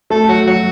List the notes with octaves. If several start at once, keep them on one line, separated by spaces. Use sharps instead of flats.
A3 A4
F#3 F#4
F#3 F#4